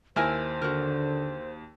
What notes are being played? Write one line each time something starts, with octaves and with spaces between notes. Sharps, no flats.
D#2 E4 A#4 C5 G#5 E6 A#6
D3 F#4 A#4